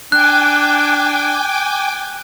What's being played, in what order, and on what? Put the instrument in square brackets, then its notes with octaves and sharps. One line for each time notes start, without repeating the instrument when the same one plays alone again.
[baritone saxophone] D4 [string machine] G5 G#5 D6 [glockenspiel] F#6